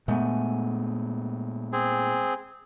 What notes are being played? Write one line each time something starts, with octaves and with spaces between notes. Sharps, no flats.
A#2 G#3 A3 B3 G#5
C4 G#4